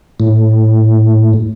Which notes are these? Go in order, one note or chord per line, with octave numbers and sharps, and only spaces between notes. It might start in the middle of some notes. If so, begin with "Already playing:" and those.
A2